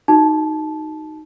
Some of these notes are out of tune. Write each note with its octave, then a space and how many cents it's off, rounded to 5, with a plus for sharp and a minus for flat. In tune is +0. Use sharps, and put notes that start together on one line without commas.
D#4 +0 F#4 +5 A5 -15